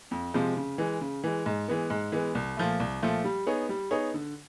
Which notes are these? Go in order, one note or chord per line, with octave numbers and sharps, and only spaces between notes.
F2
C3 F3 G#3
C#3
E3 G#3
C#3
E3 G#3
G#2
E3 G#3 B3
G#2
E3 G#3 B3
C2
A#2 F3 A3
C2
A#2 F3 A3
G3
B3 D#4 G#4 C#5
G3
B3 D#4 G#4 C#5
D3